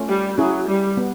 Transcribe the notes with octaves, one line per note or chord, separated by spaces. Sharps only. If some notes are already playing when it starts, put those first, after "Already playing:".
Already playing: A3 C#4 F4
G3
F#3 C#4 E4 G#4
G3
B3